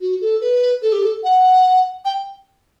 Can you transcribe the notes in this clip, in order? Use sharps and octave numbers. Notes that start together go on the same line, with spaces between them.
F#4
A4
B4
A4
G4
A4
F#5
G5